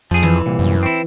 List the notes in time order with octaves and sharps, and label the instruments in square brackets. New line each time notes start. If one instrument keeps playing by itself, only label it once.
[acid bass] F2 [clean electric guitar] F3 G#4
[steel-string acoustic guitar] E3
[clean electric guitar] C2 A#2
[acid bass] F#2
[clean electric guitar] C4 E4